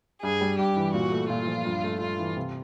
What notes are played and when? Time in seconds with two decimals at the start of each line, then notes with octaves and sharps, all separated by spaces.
0.22 G2 G#4
0.41 G3
0.59 G2 G4
0.76 E3
0.94 A#2 F#4
1.11 A3
1.30 A#2 F4
1.48 F3
1.65 G2
1.84 A3
2.01 G2 F4
2.19 E3
2.37 C3